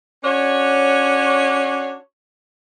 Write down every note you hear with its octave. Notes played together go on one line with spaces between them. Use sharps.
C#4 D4 F#4 C#5